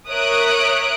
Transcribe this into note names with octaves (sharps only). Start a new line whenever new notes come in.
A#4 C#5 E5 D#6 F#6 D7